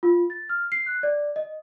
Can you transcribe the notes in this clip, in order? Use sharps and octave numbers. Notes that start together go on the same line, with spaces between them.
F4
A6
F6
C7
F#6
D5
D#5